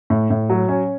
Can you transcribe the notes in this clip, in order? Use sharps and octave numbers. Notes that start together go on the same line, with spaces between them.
A2
A2
F#3
C#4